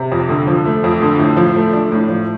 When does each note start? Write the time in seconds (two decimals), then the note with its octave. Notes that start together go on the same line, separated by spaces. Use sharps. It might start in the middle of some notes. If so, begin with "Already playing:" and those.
Already playing: C3
0.12 F2
0.29 D3
0.47 F3
0.65 A3
0.84 F2
1.02 D3
1.19 A2
1.37 F3
1.56 A3
1.73 D4
1.92 A2
2.09 F3